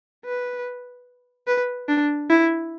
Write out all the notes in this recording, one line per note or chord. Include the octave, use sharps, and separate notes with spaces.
B4
B4
D4
E4